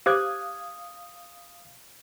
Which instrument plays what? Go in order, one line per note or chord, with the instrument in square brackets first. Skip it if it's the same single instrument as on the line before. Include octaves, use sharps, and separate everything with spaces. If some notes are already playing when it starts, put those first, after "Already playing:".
[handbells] G4 C5 [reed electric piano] F5 D#6 [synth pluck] D6 F#6 G#6